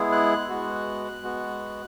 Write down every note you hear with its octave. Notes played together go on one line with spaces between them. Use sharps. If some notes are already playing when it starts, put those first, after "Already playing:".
Already playing: G#3 B3 E4 G#4
F#6
G#3 B3 F#4
G#3 B3 F#4